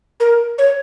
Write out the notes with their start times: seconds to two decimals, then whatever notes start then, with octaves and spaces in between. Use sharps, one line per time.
0.20 A#4
0.58 C#5